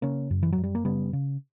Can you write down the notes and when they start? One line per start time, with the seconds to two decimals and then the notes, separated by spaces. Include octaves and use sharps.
0.02 C#3 A#3 C#4
0.31 F#2
0.43 E3
0.52 F#3
0.58 F#2
0.64 G3
0.75 A#3
0.85 C#3 G3 B3
1.13 C#3